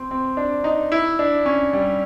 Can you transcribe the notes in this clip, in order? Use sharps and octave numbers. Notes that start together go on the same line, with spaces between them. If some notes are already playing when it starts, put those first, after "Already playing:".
Already playing: C4
C4
D4
D#4
E4
D4
C#4
G3